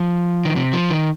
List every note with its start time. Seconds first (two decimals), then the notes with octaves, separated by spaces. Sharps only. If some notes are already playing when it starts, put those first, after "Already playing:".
Already playing: F3
0.45 D#3
0.56 C3
0.73 F3
0.91 D#3